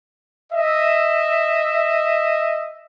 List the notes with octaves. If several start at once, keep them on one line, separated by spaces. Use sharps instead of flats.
D#5 E5